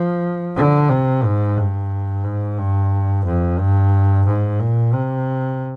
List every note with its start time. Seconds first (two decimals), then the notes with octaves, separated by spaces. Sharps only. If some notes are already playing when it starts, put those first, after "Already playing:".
Already playing: F3
0.56 D3
0.90 C3
1.24 G#2
1.57 G2
2.24 G#2
2.59 G2
3.25 F2
3.59 G2
4.27 G#2
4.60 A#2
4.94 C3